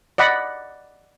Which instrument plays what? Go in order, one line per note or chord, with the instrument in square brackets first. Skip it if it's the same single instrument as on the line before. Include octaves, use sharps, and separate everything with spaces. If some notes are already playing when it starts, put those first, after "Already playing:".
[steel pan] D5 D#5 F#5 B5